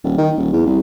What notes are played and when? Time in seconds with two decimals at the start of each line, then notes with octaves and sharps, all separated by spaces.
0.04 D#1
0.18 D#3
0.38 D#1
0.53 E2
0.66 C2